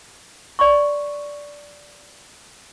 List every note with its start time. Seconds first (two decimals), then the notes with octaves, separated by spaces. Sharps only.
0.59 D5 C6 C#6